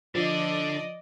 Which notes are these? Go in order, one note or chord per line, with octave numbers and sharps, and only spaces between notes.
D3 F3 D5 D#5